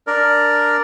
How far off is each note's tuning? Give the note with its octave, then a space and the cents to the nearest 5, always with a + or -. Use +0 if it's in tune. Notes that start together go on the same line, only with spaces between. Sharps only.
D4 +0 A#4 +0 D5 +0